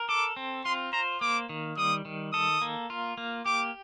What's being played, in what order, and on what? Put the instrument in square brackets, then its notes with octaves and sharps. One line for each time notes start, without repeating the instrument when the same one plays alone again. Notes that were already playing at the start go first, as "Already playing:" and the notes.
Already playing: [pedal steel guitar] A#4
[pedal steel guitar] A4 [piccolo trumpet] D6
[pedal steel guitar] C4
[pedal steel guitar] F4 [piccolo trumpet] C6
[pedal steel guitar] C5 [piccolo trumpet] A#5
[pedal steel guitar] A#3 [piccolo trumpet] D6
[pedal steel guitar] D#3
[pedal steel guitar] G3 [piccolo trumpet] D#6
[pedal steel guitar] D#3
[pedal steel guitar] A4 [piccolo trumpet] D#6
[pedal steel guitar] A#3
F4
A#3
[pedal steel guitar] G4 [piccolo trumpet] D6